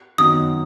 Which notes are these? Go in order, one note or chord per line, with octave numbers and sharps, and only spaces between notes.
F#2 D#3 F#3 B3 D#4 D#6